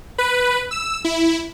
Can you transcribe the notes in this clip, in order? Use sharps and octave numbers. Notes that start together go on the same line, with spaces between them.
B4
E6
E4